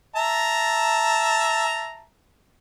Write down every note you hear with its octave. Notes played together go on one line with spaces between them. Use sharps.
E5 A5 A#5